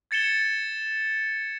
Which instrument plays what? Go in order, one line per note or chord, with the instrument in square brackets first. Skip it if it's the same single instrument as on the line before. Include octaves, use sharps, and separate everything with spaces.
[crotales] G#6 A6 C#7 E7 G7